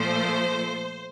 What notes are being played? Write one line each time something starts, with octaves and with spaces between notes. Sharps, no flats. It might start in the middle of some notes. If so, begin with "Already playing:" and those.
Already playing: A#2 F3 A3 C5